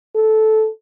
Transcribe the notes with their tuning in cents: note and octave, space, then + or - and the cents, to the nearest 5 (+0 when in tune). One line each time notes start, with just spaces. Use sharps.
A4 -10